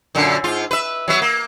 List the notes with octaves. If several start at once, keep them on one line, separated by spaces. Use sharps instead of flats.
F#2 A#2 D3
G#2 F4
B4 E5
F#3 B3 E5
A#3